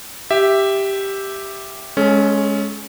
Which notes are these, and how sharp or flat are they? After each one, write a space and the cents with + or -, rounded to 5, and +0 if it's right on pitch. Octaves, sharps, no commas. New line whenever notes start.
G4 +0 E5 +0
G#3 +10 C#4 +0 A4 -30